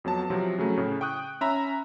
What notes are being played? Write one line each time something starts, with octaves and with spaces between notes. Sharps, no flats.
F2 F#3 B3 A5
C3 F3 F#3 C4
C#3 F#3 A3
A2 C#3
G5 C#6 D#6 F#6 G6
C#4 E5 A#5 B5